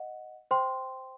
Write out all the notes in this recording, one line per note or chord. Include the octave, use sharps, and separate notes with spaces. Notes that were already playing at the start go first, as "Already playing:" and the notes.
Already playing: D#5 F#5
C5 G5 C6